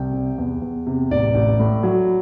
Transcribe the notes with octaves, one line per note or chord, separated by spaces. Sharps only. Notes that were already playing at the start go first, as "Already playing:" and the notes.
Already playing: C2 G5
C3
E2
E2
C3
A1 D5
A1
A2
F#3